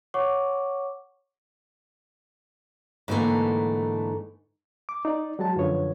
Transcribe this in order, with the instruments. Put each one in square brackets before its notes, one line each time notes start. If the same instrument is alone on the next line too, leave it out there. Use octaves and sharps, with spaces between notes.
[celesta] C#5 F#5 C#6 D6
[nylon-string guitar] G#2 D3 E3 F3 A3 A#3
[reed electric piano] D6
D#4 D5
F#3 G#3 F#4 A5
F#2 D3 F3 B4 C#5